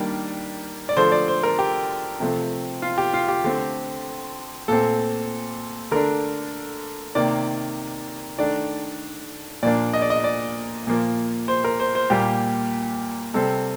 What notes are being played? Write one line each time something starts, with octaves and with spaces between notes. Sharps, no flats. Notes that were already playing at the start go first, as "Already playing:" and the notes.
Already playing: D#3 G3 A#3 D4 D5
D5
D3 F3 A3 C5
D5
C5
A#4
G4
C3 F3 A3 C4
F4
G4
F4
G4
D3 A3 C4
A#2 A3 C4 A4
D3 A3 D4 A#4
C3 D#3 A#3 D5
D#3 A3 D4 D5
A#2 F3 A#3 D4 D5
D#5
D5
D#5
D5
A#2 F3 A#3
C5
A#4
C5
C5
A#2 G3 A#3 G4
C3 G3 C4 A4